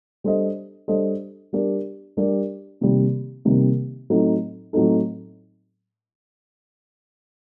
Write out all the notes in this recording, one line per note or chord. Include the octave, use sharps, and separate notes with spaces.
G3 D4 A4 C5 D#5
G3 D4 A4 C5 D#5
G3 D4 G4 A#4 D5
G3 D4 G4 A#4 D5
C3 D#3 G3 A#3
C3 D#3 G3 A#3
A2 F#3 C4 D#4 A4
A2 F#3 C4 D#4 A4